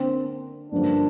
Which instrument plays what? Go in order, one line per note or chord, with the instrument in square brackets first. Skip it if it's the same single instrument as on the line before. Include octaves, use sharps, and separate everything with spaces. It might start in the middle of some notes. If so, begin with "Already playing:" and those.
Already playing: [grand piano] D3 A#3 D4 A#4 [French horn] C4
[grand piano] G2 D3 F3 A#3 [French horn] D4